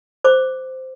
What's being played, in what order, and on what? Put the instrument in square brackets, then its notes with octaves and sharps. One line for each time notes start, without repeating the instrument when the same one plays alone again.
[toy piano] C5 D6